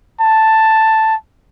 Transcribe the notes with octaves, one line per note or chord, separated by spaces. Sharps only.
A5